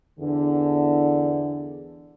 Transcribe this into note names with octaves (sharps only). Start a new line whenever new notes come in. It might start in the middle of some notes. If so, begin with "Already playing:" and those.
E2 D3